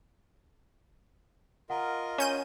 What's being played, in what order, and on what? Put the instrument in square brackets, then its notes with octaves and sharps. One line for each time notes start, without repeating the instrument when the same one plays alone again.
[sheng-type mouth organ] F4 A#4 D#5 [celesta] F#5 A#5
[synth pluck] C#4 G6 D#7